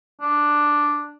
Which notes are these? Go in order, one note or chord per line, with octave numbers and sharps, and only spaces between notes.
D4